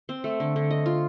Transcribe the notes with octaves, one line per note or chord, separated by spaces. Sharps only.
C4
A3
D3
D3
D#5
F4